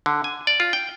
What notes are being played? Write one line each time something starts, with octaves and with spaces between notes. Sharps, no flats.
D3
G#5
D5
F4
G5